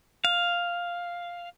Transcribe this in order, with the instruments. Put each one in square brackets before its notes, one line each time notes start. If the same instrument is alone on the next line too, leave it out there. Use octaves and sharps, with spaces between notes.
[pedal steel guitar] F5